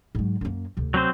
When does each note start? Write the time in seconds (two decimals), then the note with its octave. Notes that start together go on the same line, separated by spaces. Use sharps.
0.15 G#2 F#3
0.41 F#2 A#3
0.77 D2 C3
0.94 F#3 C4 C5